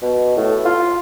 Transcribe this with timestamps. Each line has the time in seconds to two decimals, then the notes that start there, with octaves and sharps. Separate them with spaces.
0.02 B2
0.36 A2
0.65 F4